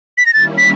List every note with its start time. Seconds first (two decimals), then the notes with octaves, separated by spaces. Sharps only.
0.18 B6
0.26 A#6
0.34 D#3 G3 A#3 C#4 E4 A6
0.58 B6